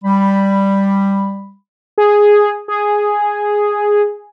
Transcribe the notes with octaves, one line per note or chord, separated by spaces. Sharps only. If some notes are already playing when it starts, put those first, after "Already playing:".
G3 B5
G#4
G#4